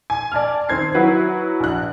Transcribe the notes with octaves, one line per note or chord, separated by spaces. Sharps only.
G#5
D5 G#5 A5 F6
D#3 C4 G#6 C7
F#3 E4 F#4 B4
A#1 F#6